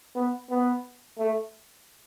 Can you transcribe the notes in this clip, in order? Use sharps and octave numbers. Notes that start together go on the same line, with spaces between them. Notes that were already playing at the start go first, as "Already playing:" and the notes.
B3
B3
A3